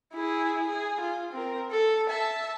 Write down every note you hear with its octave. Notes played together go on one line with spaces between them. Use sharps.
E4 G#4
G#4
F4
C4 A#4
A4
E5 A5